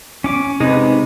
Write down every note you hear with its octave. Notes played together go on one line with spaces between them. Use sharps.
C#4 D6
C3 G#3 D#4 B4